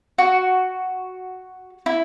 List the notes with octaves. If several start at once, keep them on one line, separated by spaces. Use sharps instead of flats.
F#4
E4